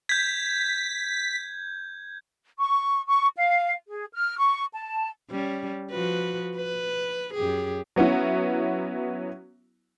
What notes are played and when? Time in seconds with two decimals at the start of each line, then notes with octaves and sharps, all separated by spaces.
0.09 G6 G#6 B6
2.58 C#6
3.06 C#6
3.36 F5
3.90 G#4
4.13 F6
4.39 C#6
4.73 A5
5.30 G3 C#4
5.91 F3 F#4 B4
6.56 B4
7.34 F#2 G4 G#4
7.96 F#3 B3 C#4 E4